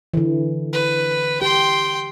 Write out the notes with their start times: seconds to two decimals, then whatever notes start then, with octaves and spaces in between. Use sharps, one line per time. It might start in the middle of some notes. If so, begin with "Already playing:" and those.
0.14 D3 E3
0.73 B4
1.42 G4 G5 C6